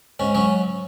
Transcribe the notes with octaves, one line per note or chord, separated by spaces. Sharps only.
G#2 C#4
F#3 C#4